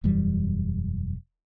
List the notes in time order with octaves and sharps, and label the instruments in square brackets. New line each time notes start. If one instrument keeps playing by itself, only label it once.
[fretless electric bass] E1 F#2 E3 G3